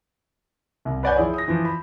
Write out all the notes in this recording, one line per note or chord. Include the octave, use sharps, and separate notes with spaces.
C2
B4 C#5 D5 F#5 G#5 G6
F3 E4 G#4 C#5
D#6 A#6
E3 F3
B5